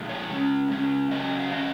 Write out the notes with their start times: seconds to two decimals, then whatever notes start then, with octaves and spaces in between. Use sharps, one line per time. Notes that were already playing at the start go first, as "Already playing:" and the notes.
Already playing: A#2 F3 G#3
0.09 C#5
0.30 C#3 G#3 C#4
0.70 C#3 G#3 C#4
1.11 C#3 F#3 C#4 D#5
1.39 F5
1.51 D#3 G#3 C#4 D#5